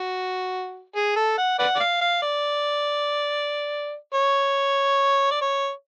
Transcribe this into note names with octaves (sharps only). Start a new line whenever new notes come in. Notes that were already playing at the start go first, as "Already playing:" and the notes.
Already playing: F#4
G#4
A4
F#5
B4 D5 F#5
D5
F5
F5
D5
C#5
D5
C#5